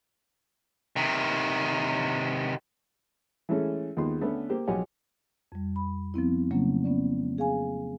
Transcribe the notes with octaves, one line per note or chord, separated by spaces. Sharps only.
C3 D#3
E3 G#3 A3 C#4 A4
D#2 D#3 G#3 B3 F4 C6
D3 A3 B3 C#4 B4
A#3 G4 C5
B1 F3 G4 C#5 F#5 G#5
F2 G3
B5
F3 B3 C4 E4
C#3 F#3 A3 A#3 C#4
B3 C#4 D5
G#4 F5 G#5